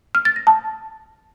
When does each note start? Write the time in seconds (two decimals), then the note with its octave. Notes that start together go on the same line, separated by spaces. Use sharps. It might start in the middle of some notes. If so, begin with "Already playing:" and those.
0.15 F6
0.25 A6
0.36 A#6
0.47 A5